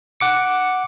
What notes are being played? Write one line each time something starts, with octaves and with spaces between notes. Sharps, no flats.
F#5 D6 C#7